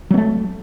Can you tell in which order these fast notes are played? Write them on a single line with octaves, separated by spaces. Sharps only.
F#3 B3 A3